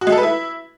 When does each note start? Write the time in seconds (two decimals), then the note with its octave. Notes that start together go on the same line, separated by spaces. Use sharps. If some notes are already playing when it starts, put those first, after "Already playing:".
0.01 F#4
0.07 G#3
0.12 A4
0.18 B4
0.23 E4